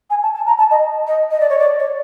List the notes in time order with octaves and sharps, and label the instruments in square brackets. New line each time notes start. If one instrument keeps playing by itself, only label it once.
[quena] G#5
A5
A5
A#5
A5
D#5
D#5
D#5
D5
C#5
D5
C#5